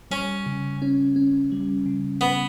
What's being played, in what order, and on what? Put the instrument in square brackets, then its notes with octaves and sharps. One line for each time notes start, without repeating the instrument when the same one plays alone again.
[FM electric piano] G3 [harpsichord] C#4
[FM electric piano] C#3
C#4
C#4
G3
C#3
[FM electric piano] C#3 [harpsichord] B3